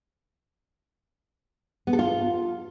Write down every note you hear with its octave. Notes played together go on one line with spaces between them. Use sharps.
B3
A4
F4